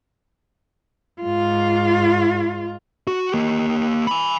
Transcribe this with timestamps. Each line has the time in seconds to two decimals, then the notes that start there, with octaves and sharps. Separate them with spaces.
1.21 G#2 F4
3.07 F#4
3.32 A#3 G4
4.07 G#5 B5